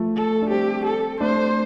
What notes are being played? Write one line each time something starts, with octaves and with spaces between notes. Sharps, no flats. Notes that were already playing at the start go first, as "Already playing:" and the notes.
Already playing: F3 A3
A4
D4
G3 C4 G4
A4
A3 D4 C5